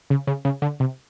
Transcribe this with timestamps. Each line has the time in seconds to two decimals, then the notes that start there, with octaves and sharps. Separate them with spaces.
0.10 C#3
0.27 C#3
0.45 C#3
0.62 D3
0.80 C3